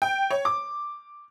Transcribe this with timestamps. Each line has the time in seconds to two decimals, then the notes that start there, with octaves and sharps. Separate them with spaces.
0.02 G5
0.31 C#5
0.45 D6